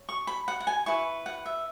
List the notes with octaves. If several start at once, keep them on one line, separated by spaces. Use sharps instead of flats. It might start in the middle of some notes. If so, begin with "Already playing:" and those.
Already playing: C#5
C#6
B5
F#5
F#5
G#5
E4 B4 C#6
F#5
E5